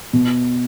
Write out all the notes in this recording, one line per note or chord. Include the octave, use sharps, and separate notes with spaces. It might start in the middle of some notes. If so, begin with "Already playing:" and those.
B2